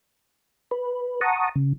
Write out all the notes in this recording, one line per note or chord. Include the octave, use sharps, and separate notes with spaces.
B4
F#5 A5 A#5 C#6 D#6
C#3